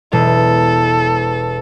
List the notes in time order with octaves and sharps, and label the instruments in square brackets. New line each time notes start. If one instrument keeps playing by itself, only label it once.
[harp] E1 [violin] A4